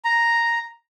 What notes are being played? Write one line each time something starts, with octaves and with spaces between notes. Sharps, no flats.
A#5